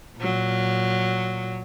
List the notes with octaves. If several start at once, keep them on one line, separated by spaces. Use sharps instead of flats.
A#2 F#3